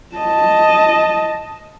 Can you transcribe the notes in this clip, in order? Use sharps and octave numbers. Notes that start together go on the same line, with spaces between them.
D#5 A5